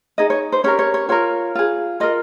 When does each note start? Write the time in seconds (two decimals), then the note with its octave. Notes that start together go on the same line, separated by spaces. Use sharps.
0.18 D#4 G#4 D#5
0.30 C#5
0.52 C5
0.64 C#4 G4 A#4 C#5
0.79 C#5
0.94 C#5
1.09 F4 A#4 C#5
1.55 F4 G#4
2.00 F4 A#4 D#5